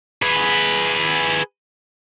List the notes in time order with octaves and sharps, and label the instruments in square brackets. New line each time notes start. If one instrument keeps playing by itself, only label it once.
[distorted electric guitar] G#4 B4